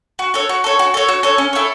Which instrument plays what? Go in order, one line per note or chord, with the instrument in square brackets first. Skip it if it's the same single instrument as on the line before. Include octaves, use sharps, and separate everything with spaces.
[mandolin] F#4
A4 C#5
F#4
A4 C#5
F#4
A4 C#5
F#4
A4 C#5
C#4
E4 A4 C#5